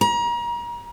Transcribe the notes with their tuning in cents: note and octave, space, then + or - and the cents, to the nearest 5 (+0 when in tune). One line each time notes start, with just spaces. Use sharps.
A#5 +35